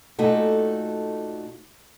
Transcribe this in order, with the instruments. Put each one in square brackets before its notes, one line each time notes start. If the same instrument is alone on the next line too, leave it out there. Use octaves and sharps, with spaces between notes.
[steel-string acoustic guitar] A#2 A3 D#4 F#4 A4